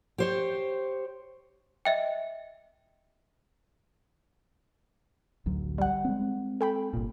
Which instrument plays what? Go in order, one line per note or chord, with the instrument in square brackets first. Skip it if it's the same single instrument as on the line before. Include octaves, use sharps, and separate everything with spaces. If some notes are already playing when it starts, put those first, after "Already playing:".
[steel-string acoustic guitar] G4 C5 C#5
[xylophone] D#5 E5 G5
[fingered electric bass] A1 D2 F#3
[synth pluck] G3 F#5
[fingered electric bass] G#3 C4
[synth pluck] A4 G5 B5
[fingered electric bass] G1 A#2